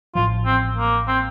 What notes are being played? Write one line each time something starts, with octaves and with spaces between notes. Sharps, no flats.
A1 A2 F3 F4
C4
A#3
C4